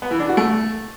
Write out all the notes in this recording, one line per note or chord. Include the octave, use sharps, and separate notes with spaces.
B3
E3
D4
F#4
A3